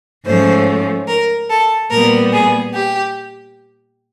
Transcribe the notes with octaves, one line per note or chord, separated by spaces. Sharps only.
G#2 F3 A3 C#4 C5
A#4
A4
A#2 G3 B3 A#4
G#4
G4